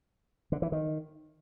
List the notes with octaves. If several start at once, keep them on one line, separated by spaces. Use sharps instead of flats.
D3
E3
D#3